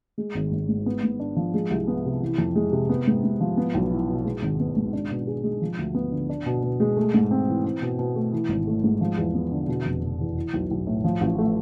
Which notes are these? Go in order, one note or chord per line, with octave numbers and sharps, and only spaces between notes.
G#3
G#1
G#1
G#2
B3
G#2
D4
F3
G#3
C2
B3
C3
E3
F2
G#3
C3
B3
G#2
G#2
F3
B3
B1
E4
B2
G#3
G#1
B3
G#2
D4
B2
G#4
G#3
F3
D2
B3
D3
D4
B2
B2
G#3
A3
G#2
C4
E3
C4
B2
B2
A3
E3
G#1
A3
G#2
F3
E2
B3
D3
B2
F1
F1
E2
E3
B1
B1
A2
F3
A1
A3